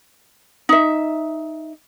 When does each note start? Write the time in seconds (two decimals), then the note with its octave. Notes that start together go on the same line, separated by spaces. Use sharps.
0.69 D#4 E5